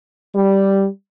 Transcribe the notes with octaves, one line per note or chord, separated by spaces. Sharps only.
G3